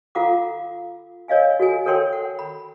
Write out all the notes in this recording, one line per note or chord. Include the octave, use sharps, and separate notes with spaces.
F4 A4 F5 F#5 A#5 D6
A#4 C#5 D#5 F5 G#5
F#4 A4 G#5
A4 A#4 C#5 G5 C6
F#5
B5